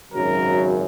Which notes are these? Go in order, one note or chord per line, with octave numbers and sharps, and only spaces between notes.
G#1 F#2 C#3 F#3 A#4